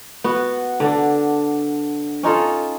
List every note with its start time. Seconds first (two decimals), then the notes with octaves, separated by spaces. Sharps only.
0.24 B3 F#4
0.80 D3 D4
2.23 C#4 D#4 F4 A4